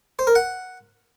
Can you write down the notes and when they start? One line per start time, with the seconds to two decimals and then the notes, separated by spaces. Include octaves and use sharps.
0.19 C5
0.27 A#4
0.35 F#5